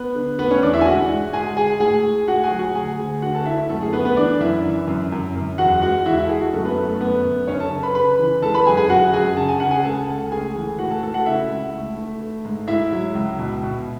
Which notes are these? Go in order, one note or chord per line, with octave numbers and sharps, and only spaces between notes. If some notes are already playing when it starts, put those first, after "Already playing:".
Already playing: B3 B4
D3
A3 B3 B4
C#4 C#5
E2 D4 D5
E4 E5
G#5
G#3 F#4 F#5
G#2
G#3 G#4 G#5
G#3 G#4 G#5
A2 G#4 G#5
A3
A2 F#4 F#5
G#4 G#5
F#3
F#4 F#5
D2 G#4 G#5
D2
D3 F#4 F#5
A4 A5
A3 E4 E5
E4 E5
F#2 A3 A4
G#4
A3 B3 B4
B3 B4
E3 D4 D5
F#2 E4 E5
E3
F#2
F#2
F#2
E2 F#4 F#5
G#3 F#4 F#5
E2 E4 E5
E4 E5
A4
G#3 G#4
F#4
F#2 A3 A4
B3 B4
A3 A4
A3 A4
F#2 B3 B4
F#2
F#2 C#4 C#5
A4 A5
C#3
B4 B5
C#3 B4 B5
E3
G#3 A4 A5
B4 B5
F#2 G#4 G#5
G#4 G#5
F#2 F#4 F#5
F#2 G#4 G#5
C#3 A5
G#5
C#3 F#5
G#4 G#5
C#2 A4 A5
C#2
A3 G#4 G#5
E3
A2 F#4 F#5
A4 A5
A2 A4 A5
F#4 F#5
C#3 E4 E5
C#2
A3
A3
A3
G#2
G#2 E4 E5
F#3
C#2
B2
B2